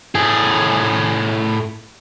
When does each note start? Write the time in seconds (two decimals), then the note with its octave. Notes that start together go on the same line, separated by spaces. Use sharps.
0.15 A2 G#4